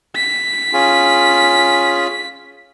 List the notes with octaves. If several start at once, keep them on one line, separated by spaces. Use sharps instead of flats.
B6
C#4 F4 G#4